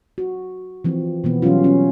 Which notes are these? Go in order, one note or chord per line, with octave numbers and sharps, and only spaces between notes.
F#4
E3 F3 C4
B2 E3 B3
E3 F#3 G3 C#4 F4
C#4